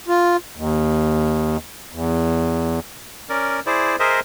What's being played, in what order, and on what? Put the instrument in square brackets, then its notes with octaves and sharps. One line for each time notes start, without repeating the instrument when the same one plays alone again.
[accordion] F4
D#2
E2
[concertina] C#4 A#4 D5
E4 G#4 C5 D5
G#4 A#4 C5 D#5 E5